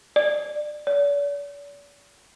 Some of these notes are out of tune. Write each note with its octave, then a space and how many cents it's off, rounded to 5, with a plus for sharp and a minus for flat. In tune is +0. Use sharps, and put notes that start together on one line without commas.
D5 +25
D5 -45